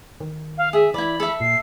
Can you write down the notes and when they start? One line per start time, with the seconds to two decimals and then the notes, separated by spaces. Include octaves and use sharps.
0.21 D#3
0.57 F5
0.73 G#4 E5
0.94 E3 E4 D5 B5
1.20 A4 E5
1.40 A#2 C7